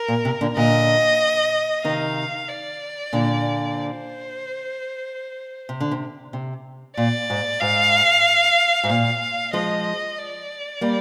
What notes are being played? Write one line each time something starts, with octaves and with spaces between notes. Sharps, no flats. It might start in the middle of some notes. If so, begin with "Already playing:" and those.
Already playing: A#4
A#2
C3
A#2 D3
A#2 D3 D#5
C3 D#3 F5
D5
A#2 D3
C5
C3
D3
C3
C3
A#2 D5
G#2
G#2 F5
G#2
A#2 F5
F3 G#3 D#5
D5
G3 A#3